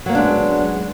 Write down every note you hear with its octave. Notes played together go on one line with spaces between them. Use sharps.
F#3 G#3 A#3 B3 D4